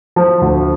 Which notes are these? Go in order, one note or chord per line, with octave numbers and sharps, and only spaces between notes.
F3
D2